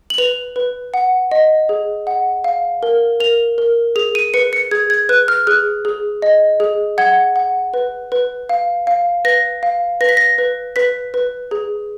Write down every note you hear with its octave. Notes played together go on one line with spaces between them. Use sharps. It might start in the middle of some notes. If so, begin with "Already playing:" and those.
F#7
B4 F7
B4
F#5
D#5
G#4
F#5
F5
A#4
A#4 F7
A#4
G#4 F7
D#7
B4 C#7
C#7
G#4 G#6
G#6
B4 F#6
F6
G#4 F#6
G#4
D#5
G#4
F#5 G#6
F#5
B4
B4
F5
F5
B4 A#6
F5
B4 A#6
B6
A#6
B4
B4 B6
B4
G#4